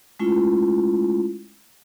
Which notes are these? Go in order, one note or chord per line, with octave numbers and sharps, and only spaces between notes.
G#3 A3 C#4 E4 F4